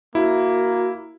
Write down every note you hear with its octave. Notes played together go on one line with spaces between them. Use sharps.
A#3 E4 F#4